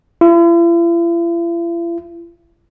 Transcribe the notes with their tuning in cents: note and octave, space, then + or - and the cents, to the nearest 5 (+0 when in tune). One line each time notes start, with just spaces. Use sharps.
E4 +45